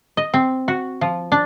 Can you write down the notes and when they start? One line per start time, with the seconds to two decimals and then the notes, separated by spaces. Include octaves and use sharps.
0.17 D#5
0.34 C4
0.68 F#4
1.01 F3
1.32 D4